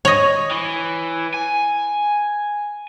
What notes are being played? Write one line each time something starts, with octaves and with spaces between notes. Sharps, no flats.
C#5 D#5
E3
G#5